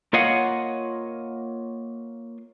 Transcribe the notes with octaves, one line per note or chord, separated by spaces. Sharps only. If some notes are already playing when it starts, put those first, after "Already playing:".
A#3 F4 C#5 D#5 F5 F#5